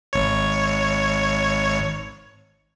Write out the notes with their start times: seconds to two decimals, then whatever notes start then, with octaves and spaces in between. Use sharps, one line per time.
0.13 G#1 C#5